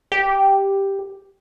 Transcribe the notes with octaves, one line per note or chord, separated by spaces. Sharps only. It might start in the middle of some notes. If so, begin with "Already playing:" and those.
G4